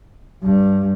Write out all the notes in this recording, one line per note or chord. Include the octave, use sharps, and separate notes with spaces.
G2